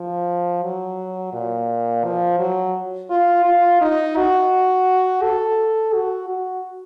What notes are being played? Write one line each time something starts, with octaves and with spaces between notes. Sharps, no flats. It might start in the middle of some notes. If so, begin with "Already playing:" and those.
Already playing: F3
F#3
A#2
F3
F#3
F4
F4
D#4
F#4
A4
F#4
F#4